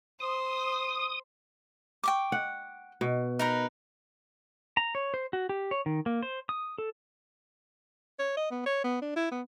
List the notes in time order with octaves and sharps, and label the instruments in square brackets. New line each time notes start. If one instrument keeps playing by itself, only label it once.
[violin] C5 [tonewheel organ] D#6
[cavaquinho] G5 C#6 D6
[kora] F#5
B2
[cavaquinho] D#4 A#4 B4
[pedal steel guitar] A#5
C#5
C5
F#4
G4
C#5
D#3
A#3
C5
D#6
A4
[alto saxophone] C#5
D#5
B3
C#5
B3
D4
E4
B3